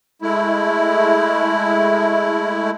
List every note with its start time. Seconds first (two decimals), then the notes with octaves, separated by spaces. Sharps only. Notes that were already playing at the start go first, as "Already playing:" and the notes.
0.22 G#3 A3 E4